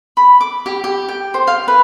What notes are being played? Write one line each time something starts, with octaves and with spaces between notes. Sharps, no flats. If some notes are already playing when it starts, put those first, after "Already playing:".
B5
D6
G4
G4
G5
C5
F5
B4